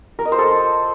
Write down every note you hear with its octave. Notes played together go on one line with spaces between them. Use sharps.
A#4
D#5
C5
A4